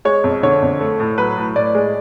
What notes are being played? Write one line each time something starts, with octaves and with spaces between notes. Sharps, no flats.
G#3 C#5
F2
D3 C#5
F2
A3
A2
F#3 B4
A2
A2 D5
G#3